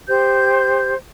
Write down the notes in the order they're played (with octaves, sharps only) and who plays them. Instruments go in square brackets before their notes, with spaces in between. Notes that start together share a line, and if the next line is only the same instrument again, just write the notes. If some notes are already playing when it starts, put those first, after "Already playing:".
[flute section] G4 C5 G6